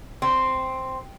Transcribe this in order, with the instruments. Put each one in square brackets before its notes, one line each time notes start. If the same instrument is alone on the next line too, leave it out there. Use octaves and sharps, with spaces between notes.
[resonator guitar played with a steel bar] C4